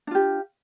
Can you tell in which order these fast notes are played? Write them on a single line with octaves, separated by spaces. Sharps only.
D4 F4 G4